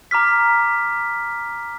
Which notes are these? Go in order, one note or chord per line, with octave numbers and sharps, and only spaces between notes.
A#5 D6 F6 B6